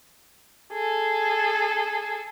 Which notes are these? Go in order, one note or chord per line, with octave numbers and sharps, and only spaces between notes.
G#4 A4